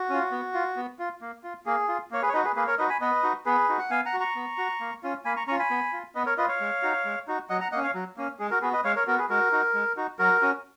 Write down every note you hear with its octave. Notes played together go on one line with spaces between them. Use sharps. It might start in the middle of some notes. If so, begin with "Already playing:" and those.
Already playing: F#4
C#4 F4
B3
F4
B3
F4
A#3
F4
A#3 G#4
F4
A#3 C#5
G#4 B4
C#5
D#4 F#4 B4 D#5
G#4 B4
A#3 G#4 B4
A#4 C#5
D#4 F#4 B4 D#5
G#5 B5
B3 B4 D#5
D#4 F#4
B3 G#4 B4
D#4 F#4
F#5
B3 F5 G#5
F#5 A#5
F#4
A#5 C#6
B3
F#4
A#3
C#4 F4
A#3 G#5 B5
A#5 C#6
C#4 F4 A#5 C#6
G#5 B5
B3
F4
B3 B4 D#5
A#4 C#5
F4 B4 D#5
C#5 F5
G#3
D#4 F#4
G#3
D#4 F#4
F#3 D#5 F#5
F#5 A#5
A#3 C#4 D#5 F#5
C#5 F5
F#3
A#3 C#4
G#3 G#4
F#4 A#4
B3 F#4 G#4 B4
B4 D#5
G#3 C#5 F5
A#4 C#5
B3 F#4 A#4
G#4 B4
G#3 F#4 A#4
D#4 F#4
G#3
D#4 F#4
F#3 F#4 A#4
C#4 F#4